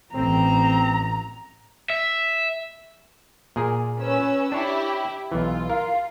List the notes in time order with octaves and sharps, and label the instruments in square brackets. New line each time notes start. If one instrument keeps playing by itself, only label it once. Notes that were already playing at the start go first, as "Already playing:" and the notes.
[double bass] A1 [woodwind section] C4 [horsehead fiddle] A#5
[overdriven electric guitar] E5
[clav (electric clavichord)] A#2 G#4 A#4
[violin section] C#4 B4 E6
[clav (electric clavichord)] D4 C#5 [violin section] E4 G4
[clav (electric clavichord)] B1 E3 [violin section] F4
[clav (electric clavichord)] A#4 [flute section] F5